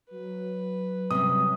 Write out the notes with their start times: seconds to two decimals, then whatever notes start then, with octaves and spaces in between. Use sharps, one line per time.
0.11 F#3 B4
1.11 C3 G3 C#4 D#6